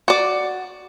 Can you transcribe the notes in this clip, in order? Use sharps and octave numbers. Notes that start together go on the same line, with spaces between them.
F#4 D5